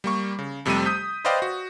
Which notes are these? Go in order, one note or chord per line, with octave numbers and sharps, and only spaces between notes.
G3 A#3 C#6
C#3
F2 C3 G3 A3 C4 D#7
D#6 G6 B6
B4 C5 D5 D#5 F5 G5
F#4